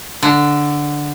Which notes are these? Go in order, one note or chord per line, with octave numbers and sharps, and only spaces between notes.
D3